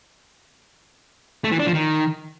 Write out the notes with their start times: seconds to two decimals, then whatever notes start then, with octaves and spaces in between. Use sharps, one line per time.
1.44 A3
1.52 E3
1.59 D4
1.67 F3
1.74 D#3